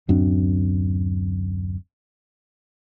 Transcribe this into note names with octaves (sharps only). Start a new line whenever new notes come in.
D1 F#2 C4 D4